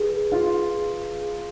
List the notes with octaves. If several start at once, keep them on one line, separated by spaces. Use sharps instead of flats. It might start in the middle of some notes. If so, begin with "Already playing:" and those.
Already playing: G#4 B4
F4 F5
G#4
G#4